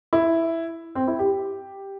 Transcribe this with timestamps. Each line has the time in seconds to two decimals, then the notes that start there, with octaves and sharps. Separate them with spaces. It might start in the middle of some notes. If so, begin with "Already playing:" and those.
0.13 E4
0.95 C4
1.08 E4
1.19 G4